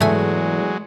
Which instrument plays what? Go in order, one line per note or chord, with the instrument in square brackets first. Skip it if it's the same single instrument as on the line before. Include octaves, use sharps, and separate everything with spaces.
[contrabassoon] E2 [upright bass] G#2 E3 [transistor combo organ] F#3 G#3 [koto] A3 G#5